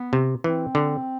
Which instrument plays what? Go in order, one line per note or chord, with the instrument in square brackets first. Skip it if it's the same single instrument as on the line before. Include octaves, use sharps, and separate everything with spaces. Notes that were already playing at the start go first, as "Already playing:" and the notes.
Already playing: [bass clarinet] B3
[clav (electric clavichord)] C3
[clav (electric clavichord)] E3 [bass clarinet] C4
[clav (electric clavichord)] D3